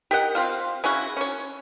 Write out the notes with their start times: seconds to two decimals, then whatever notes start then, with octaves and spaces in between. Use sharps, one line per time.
0.11 G4 A#4 D#5 F#5
0.35 C4 F4 F5
0.84 C#3 C#4 E4 F#4
1.17 C#4 C#5